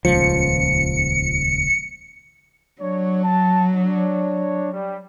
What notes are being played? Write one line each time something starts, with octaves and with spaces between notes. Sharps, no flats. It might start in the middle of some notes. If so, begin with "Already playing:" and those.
D#1 C#2 F3 C#7
F#3 D4 C#5
A5
D4 C#5
G3